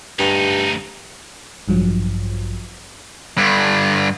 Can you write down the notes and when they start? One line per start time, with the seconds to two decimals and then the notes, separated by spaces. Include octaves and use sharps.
0.19 D2 G2 D#4
1.68 A1 G2 F3 F#3
3.38 G2 D3